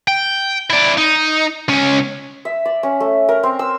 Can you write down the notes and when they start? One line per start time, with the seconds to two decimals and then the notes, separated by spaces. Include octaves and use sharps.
0.08 G5
0.70 E4 D5
0.97 D#4
1.68 C#2 C#4
2.45 E5
2.65 D5
2.83 C#4
3.00 A3
3.29 A#4
3.43 C4
3.59 E6